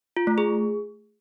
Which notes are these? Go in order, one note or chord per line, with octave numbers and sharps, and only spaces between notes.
F4
A3
G#4